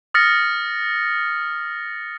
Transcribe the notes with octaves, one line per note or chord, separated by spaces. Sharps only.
D#6 F6 A6 A#6 C#7